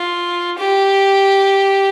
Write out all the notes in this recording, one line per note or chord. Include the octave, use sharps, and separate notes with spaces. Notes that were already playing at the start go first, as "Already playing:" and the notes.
Already playing: F4
G4